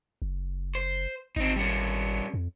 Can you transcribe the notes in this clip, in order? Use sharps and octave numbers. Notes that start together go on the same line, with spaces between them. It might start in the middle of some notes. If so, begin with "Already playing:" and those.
F#1
C5
G#1 C4 D#4
G3 C#4
F2